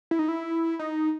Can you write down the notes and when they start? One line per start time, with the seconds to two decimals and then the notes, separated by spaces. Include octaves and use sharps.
0.11 E4
0.19 D#4
0.28 E4
0.79 D#4